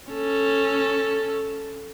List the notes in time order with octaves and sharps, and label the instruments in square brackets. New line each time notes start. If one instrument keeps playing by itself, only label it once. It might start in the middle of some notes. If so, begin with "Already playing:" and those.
[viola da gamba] C#4 A4